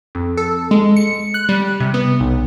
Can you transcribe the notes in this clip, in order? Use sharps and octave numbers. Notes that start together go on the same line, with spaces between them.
F2
A4
G#3
C#7
F#6
G3
C3
B3
B1